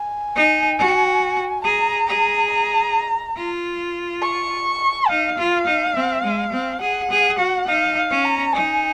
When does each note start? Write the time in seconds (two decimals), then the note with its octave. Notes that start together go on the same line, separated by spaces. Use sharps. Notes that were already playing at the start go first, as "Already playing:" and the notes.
Already playing: G#5
0.36 D#4
0.79 F#4
1.64 G#4 A#5
2.08 G#4
2.50 A#5
3.37 F4
4.23 C#6
5.09 D#4 F5
5.37 F4
5.66 D#4
5.95 C4
6.24 G#3
6.52 C4
6.81 G#4 F#5
7.10 G#4
7.38 F#4
7.67 D#4 F5
7.97 F5
8.10 C#4
8.25 A#5
8.53 D#4 G#5